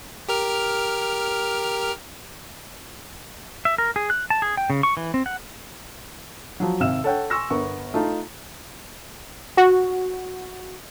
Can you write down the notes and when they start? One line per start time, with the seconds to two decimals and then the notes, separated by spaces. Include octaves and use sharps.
0.29 G4 A#4 F6
3.65 E5
3.78 A#4
3.96 G#4
4.10 F#6
4.30 A5
4.42 G#4
4.57 G5
4.70 C#3
4.83 C#6
4.97 E3
5.14 C4
5.26 F#5
6.60 F3 F#3
6.80 G#1 C3 F5 E6 E7
7.04 A4 C#5 F#5 G5
7.30 G#5 C6 C#6 E6 A#6
7.50 G1 B3 A#4 C#6
7.94 A3 D#4 F4
9.57 F#4